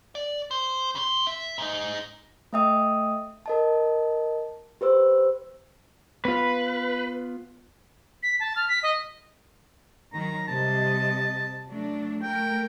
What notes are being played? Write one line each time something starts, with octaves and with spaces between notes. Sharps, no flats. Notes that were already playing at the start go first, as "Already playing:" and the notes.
D5
C5
C#3 C6
E5
G#2 D#4
A3 D#5 E5 G5 D#6
A#4 D#5 A5
G4 B4 C5 E6
B3 F4 B4
B6
A5
F6
B6
D#5
D#3 F#3 A#5
C3 G3 D#5 A5
F#3 A3 D4
A3 A#4 G5